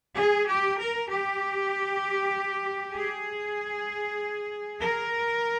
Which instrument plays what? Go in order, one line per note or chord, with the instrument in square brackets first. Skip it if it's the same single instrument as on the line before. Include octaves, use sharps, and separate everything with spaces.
[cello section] G#4
G4
A#4
G4
G#4
A#4